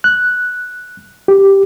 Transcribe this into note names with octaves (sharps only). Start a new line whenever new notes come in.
F#6
G4